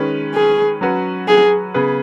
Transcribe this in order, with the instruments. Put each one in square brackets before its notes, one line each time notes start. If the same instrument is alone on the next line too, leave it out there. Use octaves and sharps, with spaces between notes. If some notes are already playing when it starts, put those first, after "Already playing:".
Already playing: [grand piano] D#3 G#3 C#4 B4
[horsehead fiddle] G#4
[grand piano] F#3 C#4 F#4 B4
[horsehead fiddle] G#4
[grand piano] C#3 B3 G#4 B4